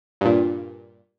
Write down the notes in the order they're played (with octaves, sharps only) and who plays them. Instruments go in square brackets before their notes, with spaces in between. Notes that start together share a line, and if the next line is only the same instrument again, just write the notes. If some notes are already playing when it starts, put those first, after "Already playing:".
[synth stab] G2 A#2